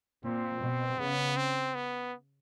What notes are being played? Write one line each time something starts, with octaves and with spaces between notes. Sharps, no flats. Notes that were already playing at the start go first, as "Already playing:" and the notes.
A#2 C4
B2
C#3 B3
C4
B3